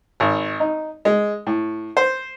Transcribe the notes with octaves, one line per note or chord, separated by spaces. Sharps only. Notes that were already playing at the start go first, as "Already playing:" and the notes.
G#1
D#4
G#3
A2
C5